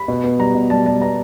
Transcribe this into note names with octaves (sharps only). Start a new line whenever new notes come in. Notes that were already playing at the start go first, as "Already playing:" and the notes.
Already playing: B5
B2
B3
G3 A#5
B2
G3 A5
G3 A5
B3 A#5